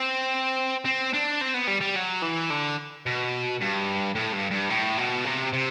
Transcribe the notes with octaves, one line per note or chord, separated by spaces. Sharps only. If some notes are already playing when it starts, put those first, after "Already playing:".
Already playing: C4
C4
D4
C4
B3
G3
G3
F#3
E3
D3
B2
G2
A2
G2
G2
A2
B2
C3
C3